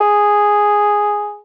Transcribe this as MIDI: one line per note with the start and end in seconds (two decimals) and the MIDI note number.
0.01 1.38 68